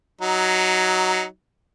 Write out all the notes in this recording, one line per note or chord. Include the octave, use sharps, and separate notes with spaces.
F#3 D#4